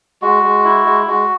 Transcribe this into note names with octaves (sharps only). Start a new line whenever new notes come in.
G#3 F#4
G#3
E4
G#3
G#3 F#4